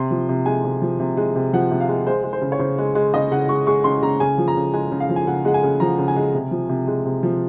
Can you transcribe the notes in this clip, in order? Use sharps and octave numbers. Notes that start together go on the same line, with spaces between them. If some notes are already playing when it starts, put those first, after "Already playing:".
Already playing: C3 C6
F3
C3
G#3 G#5
C3
F3
C3
G#3
C3
F3 F#5
C3
F5
G#3
G#3 C5
G#3
C5
C#3
C#5
C#3 C5
G#3
G#3
C#3 D#5
C#3 F#5
G#3 C#6
G#3 C#6
C#3 C6
C#3 A#5
C#3 G#5
F3
A#5
C#3
G#3 G#5
C#3
F5
F3
G#5
C#3 F#5
G#3 F#5
G#5
C#3
F3 A#5
C#3
G#5
G#3
C3
F3
C3
G#3
C3
F3